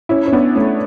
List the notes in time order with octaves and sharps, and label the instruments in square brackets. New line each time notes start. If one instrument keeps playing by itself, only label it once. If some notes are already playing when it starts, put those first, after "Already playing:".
[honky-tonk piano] C#4 E4
C#4
B3 D4
A3 C#4